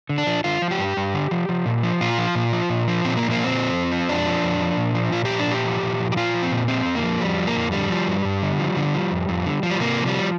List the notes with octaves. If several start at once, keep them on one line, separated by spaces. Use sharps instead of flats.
D3
D4
F3
D3 F4
F3
G4
G2
G2
D3
F3
F3
A#2
F3
A#2 F4
F3
A#2
F3
A#2
F3
A#2 C4
A#3
F3
A#3
A#2 C4
F3
F2
F3
F2 D4
F3
F2
F3
A#2
F3
A#2 F4
F3 G4
D4
A#2 G4
F3
A#2
F3
G4
A#2 F4
F3
C4
A#2
F3 C4
F2
A#3
F3
F2 G3
F3
A#3
F2
D3 G3
F3
G2
G2
D3
F3
D3
F3
F2
F2
D3
F3
G3
C3 A#3
F3
G3